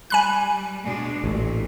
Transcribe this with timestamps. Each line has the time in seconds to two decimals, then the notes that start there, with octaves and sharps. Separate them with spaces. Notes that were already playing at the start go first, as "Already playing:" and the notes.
0.10 G3 G#5 B5 F#6
0.85 B2 G#3 D4
1.24 A1 D2 A#2